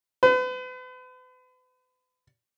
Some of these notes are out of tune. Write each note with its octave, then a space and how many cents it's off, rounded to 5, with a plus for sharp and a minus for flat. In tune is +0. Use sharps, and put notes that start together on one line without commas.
B4 +40